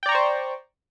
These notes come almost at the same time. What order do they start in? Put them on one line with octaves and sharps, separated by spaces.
G5 D5 A#5 C#6 C5